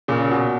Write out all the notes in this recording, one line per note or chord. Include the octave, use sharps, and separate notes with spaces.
A#2 C#3
B2